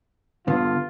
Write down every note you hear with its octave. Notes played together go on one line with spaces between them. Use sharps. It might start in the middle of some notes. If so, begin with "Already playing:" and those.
G2 D3 B3 F4